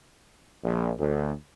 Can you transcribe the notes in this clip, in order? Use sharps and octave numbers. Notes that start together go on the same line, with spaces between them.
A#1
D2